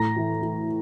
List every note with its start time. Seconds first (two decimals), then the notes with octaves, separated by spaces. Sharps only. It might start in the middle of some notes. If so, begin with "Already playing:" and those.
Already playing: A2 A#5 A#6
0.16 E3
0.42 E3